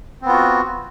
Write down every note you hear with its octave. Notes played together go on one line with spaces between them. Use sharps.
B3 C4 F4 F#4